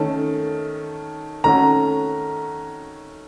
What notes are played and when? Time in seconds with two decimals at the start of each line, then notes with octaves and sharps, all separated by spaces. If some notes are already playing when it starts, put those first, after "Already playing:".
Already playing: D#3 A3 C#4 A5
1.44 D#3 A3 C#4 F#4 A#5